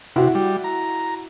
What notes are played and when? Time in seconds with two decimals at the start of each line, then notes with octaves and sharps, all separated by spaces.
0.16 C3 E4 F#4
0.35 G3
0.64 A#5